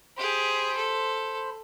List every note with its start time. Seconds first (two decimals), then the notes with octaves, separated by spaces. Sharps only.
0.17 G4 G#4 C5 B5
0.76 A4